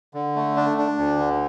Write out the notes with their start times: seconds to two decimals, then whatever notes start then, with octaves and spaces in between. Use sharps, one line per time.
0.14 D3
0.36 A3
0.56 D4
0.78 D4
0.98 D2
1.18 D3